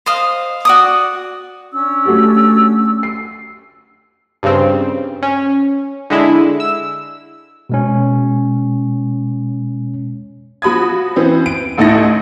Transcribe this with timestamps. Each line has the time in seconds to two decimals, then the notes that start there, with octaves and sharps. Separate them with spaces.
0.06 C5 D#5 F5
0.65 F#4 D5 D#6
1.72 C#4 D4 E6
2.05 A3 F#4 G4
3.03 C7
4.43 G2 C#3 C4
5.22 C#4
6.10 D3 G#3 E4
6.60 E6
7.70 B2 G#3 C#4
10.62 F3 F#4 B5 D#6 G#6
11.16 E3 B3 C4
11.46 D7
11.77 A1 D2 A3 D#4 E4 A#6